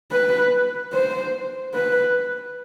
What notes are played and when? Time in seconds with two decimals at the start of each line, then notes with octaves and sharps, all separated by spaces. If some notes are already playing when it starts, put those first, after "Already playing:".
0.11 B4
0.92 C5
1.74 B4